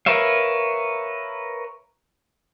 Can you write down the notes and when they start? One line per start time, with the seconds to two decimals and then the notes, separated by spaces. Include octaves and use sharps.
0.06 A#4 B4 C#5 E5 F5